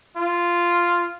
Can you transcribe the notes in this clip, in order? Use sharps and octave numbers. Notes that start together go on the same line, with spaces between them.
F4